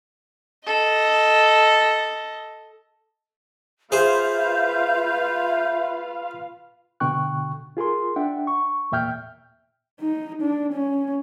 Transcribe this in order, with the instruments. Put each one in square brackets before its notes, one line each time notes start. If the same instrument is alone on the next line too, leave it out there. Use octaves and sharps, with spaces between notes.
[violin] A4 D#5
[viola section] F4 B4 F5 [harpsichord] G#4 C5 [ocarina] E5 [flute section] G6
[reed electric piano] B2 D3 G5 C#6 F#6
F4 G#4 A#4 C6
D4 E5 F#5 G5
C#6
E2 A#2 E5 G5 F6 G6
[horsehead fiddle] D#4
D4
C#4